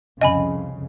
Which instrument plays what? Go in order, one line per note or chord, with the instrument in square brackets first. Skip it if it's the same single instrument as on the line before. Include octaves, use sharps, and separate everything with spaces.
[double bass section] C2 F2 C#3 [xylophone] D#5 G#5 B5